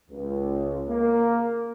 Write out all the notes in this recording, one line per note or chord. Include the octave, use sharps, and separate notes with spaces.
C#2
A#3